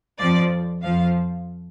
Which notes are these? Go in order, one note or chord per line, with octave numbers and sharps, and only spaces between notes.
F2 F3 D5
F2 F3 F5